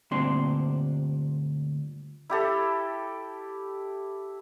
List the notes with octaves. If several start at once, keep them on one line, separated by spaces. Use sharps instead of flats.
D2 G2 A#2 C4 D4 C6
E4 G4 A4